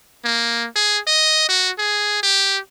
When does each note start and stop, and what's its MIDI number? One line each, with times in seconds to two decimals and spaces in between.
0.25 0.67 58
0.76 0.98 68
1.07 1.44 75
1.49 1.70 66
1.79 2.22 68
2.23 2.58 67